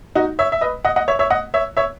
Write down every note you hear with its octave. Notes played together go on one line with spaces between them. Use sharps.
D#4 F#4
C#5 E5
E5
B4 D#5
D#5 F#5
D#5 F#5
C#5 E5
C#5 E5
D#5 F#5
C#5 E5
C#5 E5